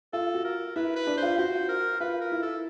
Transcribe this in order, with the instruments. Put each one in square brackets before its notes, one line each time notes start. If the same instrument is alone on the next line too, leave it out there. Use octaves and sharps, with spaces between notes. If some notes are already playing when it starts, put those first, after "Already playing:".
[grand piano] F4 [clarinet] A4
[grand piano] F#4
[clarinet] A#4
[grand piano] E4 [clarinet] B4
[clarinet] B4
[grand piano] D4
[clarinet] C5
[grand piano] F4
[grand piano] F#4 [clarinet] C5
[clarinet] A#4
[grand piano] F4 [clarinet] B4
[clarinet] A#4
[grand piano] E4
[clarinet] A4